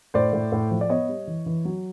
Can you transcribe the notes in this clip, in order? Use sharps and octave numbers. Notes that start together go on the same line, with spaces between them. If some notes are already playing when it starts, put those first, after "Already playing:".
A2 C5 D5
A2
A2
F3
D5
B3 C#5 D#5
G3
E3
E3
F#3